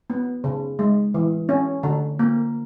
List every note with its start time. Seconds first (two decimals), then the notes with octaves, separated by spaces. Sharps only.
0.10 B3
0.44 C#3
0.79 G#3
1.14 E3
1.49 C#4
1.83 D3
2.19 A#3